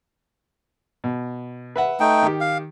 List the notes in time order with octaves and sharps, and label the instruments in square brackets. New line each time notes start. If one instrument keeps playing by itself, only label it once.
[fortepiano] B2
B4 E5 F#5
[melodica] A3 D#4 G5
[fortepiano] D#3 G4
[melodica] F5